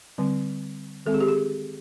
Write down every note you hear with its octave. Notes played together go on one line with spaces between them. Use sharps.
D3 G3 C4
D#3 G#3 C4 A4
G#4
G4
G#4